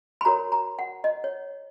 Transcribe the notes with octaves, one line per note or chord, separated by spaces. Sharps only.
B5
F#4 A#4 C#5 A#5
A#5
F#5
D#5
C#5